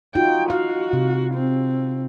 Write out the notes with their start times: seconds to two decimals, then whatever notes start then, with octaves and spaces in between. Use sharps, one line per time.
0.15 D#4 F4 F#4 G5
0.50 F#4 F5
0.93 C3
1.35 C4